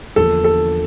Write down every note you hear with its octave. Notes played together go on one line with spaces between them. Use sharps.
E2 D3 F3 A#3 D4 A4
A4